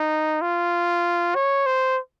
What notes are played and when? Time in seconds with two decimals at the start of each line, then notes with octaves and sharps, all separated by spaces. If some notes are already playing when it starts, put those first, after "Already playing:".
Already playing: D#4
0.41 F4
1.35 C#5
1.66 C5